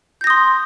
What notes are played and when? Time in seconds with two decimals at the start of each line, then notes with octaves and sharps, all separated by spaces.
0.21 G6
0.24 A#6
0.27 D#6
0.30 C6